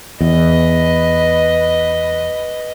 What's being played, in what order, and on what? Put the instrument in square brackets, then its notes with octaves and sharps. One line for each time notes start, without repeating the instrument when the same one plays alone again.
[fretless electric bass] E2 [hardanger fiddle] B4 D#5